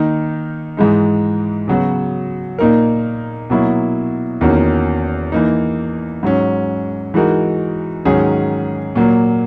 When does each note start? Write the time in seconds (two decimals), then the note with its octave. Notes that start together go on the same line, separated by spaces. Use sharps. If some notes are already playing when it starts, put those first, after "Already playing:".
Already playing: D#3 A#3 D#4
0.77 G#2 E3 G#3 D#4
1.68 C#3 F#3 B3 F#4
2.59 A#2 A#3 D#4 A#4
3.50 B2 F#3 A#3 E4
4.41 E2 D#3 A#3 C#4 F#4
5.32 E3 A#3 D#4
6.23 G#2 F#3 C#4
7.14 E3 G#3 D#4 F#4 A#4
8.05 G#2 D#3 F#3 C#4 G#4
8.96 A#2 F#3 A#3